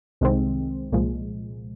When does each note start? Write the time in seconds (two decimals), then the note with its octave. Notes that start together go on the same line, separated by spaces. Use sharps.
0.21 C2 C3 D#3 G#3 C4
0.92 C2 A#2 F3 G#3